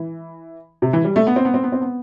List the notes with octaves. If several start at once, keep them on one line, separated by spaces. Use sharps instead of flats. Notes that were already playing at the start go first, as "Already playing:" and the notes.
Already playing: E3
C3
E3
G3
A3
B3
C4
B3
C4
B3
C4
B3